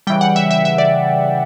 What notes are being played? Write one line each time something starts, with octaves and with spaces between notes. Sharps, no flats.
C#3 E3 G3 G5
F#5
E5
E5
E5
D5